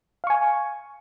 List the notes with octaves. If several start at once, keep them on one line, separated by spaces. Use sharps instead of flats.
F5 G#5 C#6